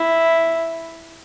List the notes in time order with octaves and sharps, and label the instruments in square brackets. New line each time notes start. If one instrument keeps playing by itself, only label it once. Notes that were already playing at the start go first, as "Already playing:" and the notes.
Already playing: [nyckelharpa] E4